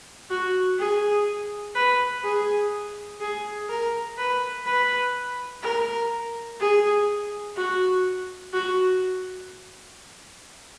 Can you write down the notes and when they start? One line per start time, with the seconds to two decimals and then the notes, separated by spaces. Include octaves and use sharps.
0.30 F#4
0.78 G#4
1.75 B4
2.24 G#4
3.20 G#4
3.69 A#4
4.17 B4
4.66 B4
5.63 A#4
6.60 G#4
7.56 F#4
8.53 F#4